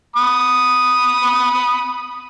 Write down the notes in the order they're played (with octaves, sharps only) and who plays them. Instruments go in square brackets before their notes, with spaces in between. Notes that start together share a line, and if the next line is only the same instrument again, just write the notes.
[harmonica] B5 D#6